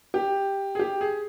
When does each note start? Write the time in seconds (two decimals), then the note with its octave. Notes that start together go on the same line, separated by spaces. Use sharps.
0.14 G4
0.75 G#4
0.79 G4
1.01 G#4